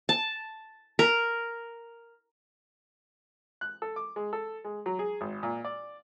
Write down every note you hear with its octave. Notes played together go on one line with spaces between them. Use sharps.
A5
A#4
F#6
A4
D6
G#3
A4
G#3
F#3
G#4
G#1
A#2
D5